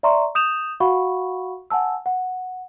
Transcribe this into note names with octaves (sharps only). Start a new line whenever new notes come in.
D5 E5 A#5 C6 C#6
D#6 G6 E7 F7
F#4 F5 F#5 B5 C#6
F#5 G#5 A5 E6
F#5